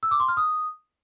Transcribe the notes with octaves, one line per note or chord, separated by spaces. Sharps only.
E6
D6
C6
F6
D#6